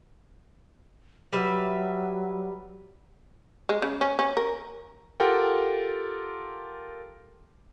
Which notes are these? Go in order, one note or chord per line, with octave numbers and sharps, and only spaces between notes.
F#3 G3 B4 E5
G#3
C#3
C#4
C#4
A#4
F4 G4 A4 A#4 F#5 G5